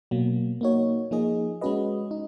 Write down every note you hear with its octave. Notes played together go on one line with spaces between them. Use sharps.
B2 F#3 A#3
A#3 D#4 F#4 C#5
F3 A#3 D#4 G#4 D#5
G#3 C#4 F#4 B4 D#5
D#4